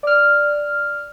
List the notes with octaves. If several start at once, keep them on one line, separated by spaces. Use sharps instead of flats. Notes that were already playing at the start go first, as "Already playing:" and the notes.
D5 F6